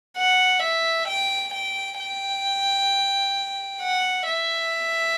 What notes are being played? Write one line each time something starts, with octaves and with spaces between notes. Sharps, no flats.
F#5
E5
G5
G5
G5
F#5
E5